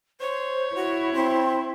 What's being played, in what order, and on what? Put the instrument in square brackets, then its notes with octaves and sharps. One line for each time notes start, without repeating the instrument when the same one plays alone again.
[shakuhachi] C5 [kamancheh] C#5
[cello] E4 [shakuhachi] F#4
[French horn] C4 [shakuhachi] C6